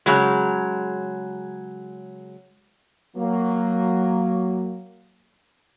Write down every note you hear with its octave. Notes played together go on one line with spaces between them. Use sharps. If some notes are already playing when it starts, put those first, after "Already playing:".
C#3 F#3 G#3
F#3 A#3